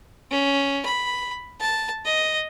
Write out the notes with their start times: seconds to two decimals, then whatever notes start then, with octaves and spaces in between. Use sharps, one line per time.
0.31 C#4
0.85 B5
1.61 A5
2.05 D#5